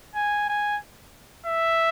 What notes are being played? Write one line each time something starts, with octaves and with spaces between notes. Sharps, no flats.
G#5
G#5
E5